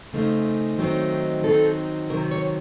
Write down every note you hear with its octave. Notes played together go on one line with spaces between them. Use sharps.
C#3 A3 C4 D#4
D#3 F#3 A3 C4 D#4
D#3 F#3 A3 C4 D#4 A4
C3 D#3 F#3 A#4
C#5